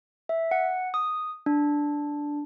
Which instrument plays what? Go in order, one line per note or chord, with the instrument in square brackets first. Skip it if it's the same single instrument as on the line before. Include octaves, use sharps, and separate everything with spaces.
[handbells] E5
F#5
D#6
D4